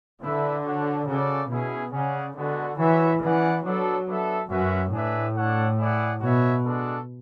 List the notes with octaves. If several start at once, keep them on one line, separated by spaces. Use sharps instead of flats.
D3 E4 B4 E5
D4 F#4 C#5 F#5
C#3 F#4 A4 D5
B2 C#4 E4 G#4
C#3 C#4 G#4 D5 F#5
D3 G#3 B3 F#4
E3 F#4 C#5 E5
E3 C#4 G#4 D5 F#5
F#3 B3 D4 A4
B3 D4 A4 E5
F#2 C#4 F#4 B4 E5
A2 D4 G#4 B4 E5
D4 A4 C#5 F#5
E4 G#4 D5 F#5
B2 F#4 C#5 E5
G#3 D4 F#4 A4